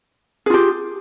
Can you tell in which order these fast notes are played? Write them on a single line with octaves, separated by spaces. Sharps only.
G#4 F4 G4